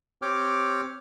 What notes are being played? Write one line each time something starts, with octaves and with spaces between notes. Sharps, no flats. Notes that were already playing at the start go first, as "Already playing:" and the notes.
C4 G4 C#5 G5 D6 F6